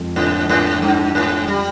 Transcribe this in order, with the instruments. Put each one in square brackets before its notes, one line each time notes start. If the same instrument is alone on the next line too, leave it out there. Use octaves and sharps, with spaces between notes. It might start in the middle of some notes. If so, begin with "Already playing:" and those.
Already playing: [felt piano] F2 G#3
[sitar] G#2 [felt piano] D3
[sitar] G#2 [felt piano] D3
[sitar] G2 [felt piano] D4
[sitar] G#2 [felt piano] G#3
[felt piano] D3 [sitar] G3